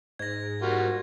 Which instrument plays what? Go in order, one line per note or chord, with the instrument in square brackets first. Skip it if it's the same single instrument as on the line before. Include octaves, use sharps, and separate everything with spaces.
[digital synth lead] G#2 [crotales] G#6 A#6
[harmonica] G3 A#3 F4 [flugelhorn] F#4